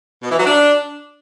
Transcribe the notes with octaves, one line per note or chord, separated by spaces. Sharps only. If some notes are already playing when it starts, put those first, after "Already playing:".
B2
E3
F#3
D4